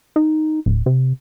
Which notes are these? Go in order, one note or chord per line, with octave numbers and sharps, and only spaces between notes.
D#4
D1
C3